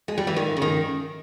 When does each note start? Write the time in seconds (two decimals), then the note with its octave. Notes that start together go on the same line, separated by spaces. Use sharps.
0.08 G#3
0.18 G3
0.27 E3
0.36 D#3
0.57 C#3
0.62 D#3